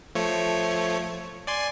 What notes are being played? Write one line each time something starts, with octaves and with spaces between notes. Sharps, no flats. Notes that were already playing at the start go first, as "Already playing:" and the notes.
F3 A3 C#5
D5 G#5 C6